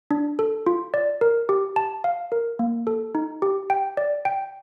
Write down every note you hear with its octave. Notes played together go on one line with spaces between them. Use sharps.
D4
A4
F4
D5
A#4
G4
A5
F5
A#4
A#3
A4
D#4
G4
G5
D5
G5